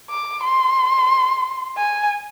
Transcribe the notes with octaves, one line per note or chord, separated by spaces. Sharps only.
D6
C6
G#5